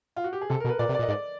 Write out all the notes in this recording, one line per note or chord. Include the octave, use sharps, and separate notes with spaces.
F4
F#4
G4
G#4
C3 A4
A#4
B2
B4
A#2 D5
C3
D5
A#2
D#5
G#2 D5